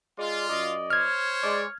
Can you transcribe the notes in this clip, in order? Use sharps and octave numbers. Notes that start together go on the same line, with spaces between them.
G#3 F4 D5
F#2 D5 D#5
C5 C#5 F6 G#6
G#3 D5